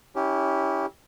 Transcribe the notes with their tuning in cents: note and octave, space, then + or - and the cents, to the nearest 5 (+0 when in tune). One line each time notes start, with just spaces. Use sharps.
C#4 +15 E4 -25 G4 +0